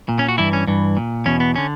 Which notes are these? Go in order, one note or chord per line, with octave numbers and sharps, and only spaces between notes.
A#2
C#4
F#4
G2 E3 E4
C#4
G2 E3
A#2
E2 B2 C#4
B3
D3 C#4